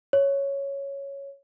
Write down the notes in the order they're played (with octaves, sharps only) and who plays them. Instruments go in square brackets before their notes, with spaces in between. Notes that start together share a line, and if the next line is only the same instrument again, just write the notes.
[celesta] C#5